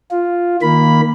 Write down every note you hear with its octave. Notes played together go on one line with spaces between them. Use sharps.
F4
D#3 A#3 B5